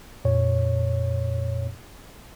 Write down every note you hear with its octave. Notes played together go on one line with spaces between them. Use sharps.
F2 A#2 C#5